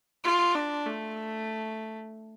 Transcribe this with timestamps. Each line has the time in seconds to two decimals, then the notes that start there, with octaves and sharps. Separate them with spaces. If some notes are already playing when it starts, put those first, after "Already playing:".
0.25 F4
0.55 D4
0.86 A3